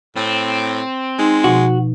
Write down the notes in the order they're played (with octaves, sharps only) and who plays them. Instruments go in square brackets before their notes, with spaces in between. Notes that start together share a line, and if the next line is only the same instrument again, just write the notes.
[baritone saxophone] A2 [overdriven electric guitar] C4
[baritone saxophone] G#3 [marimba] D#4
[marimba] B2 F3 [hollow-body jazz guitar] F#4